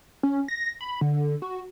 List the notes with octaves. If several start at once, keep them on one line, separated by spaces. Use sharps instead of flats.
C#4
A#6
B5
D3
F#4